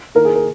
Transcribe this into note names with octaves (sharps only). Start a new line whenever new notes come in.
D#3 A#3 D#4 A#4
G#4
A#4